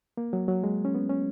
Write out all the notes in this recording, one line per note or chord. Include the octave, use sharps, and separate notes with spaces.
A#3
F#3
F#3
G#3
C#4
B3
C#4